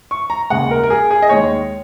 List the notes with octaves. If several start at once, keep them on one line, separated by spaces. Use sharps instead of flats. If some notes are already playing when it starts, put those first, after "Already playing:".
C#6
A#5
D#2 C#3 G#3 F#5
A#4
A#4
G#4
G#4
D#5
D#2 D#3 G#3 C#5